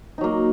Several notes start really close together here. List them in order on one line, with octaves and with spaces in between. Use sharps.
D#4 F#3 A#3